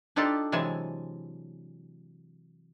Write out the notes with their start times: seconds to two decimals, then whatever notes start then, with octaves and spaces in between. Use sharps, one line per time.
0.16 D4 D#4 F4 G4 A4
0.52 C3 E3 F#3 G#3 G#5 A5